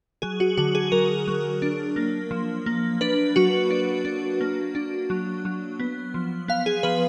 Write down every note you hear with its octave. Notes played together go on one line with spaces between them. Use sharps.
F#3 G#4
F#4
D3 F#4
G#4
F#3 A#4
F#3
D4
A#3
F3
A#3
D4 B4
F#3 F#4
D4
D4
A#3
D4
F#3
F#3
B3
F3
B3 F5
G#4
F3 B4